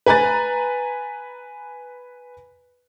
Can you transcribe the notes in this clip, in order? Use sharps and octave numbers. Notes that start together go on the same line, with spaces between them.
B4 G#5 A#5 F#6 A6